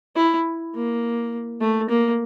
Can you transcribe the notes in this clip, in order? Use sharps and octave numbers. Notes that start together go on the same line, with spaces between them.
E4
A#3
A3
A#3